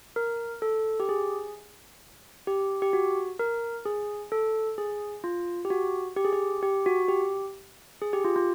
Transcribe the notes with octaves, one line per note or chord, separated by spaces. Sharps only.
A#4
A4
G4
G#4
G4
G4
F#4
A#4
G#4
A4
G#4
F4
G4
F#4
G4
G#4
G4
G4
F#4
G4
G#4
G4
F4
F4